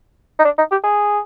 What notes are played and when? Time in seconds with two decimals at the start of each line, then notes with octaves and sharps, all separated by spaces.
0.39 D#4
0.45 D4
0.58 D#4
0.71 G4
0.84 G#4